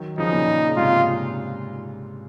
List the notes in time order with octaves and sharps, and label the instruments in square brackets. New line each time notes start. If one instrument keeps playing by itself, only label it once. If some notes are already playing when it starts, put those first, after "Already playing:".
Already playing: [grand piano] D#3 F#3
[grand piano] C#3 F3 [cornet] D#4
[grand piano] A#2 C#3
C#3
[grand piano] G#2 C3 [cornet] F4
[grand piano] A#2